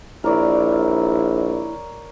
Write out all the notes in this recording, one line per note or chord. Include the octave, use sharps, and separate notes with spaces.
A#1 E4 A#4 C#5 D5